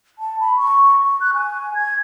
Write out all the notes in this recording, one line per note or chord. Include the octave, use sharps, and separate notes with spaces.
A5
B5
C#6
C#6
F#6
G#5
G#6